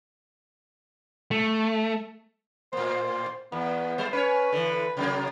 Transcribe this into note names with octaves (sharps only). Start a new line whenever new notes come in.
A3
A2 A#3 C5
E2 B3
G3 C5
C#4 B4 C#5
D3 E3
C3 F#3 A#3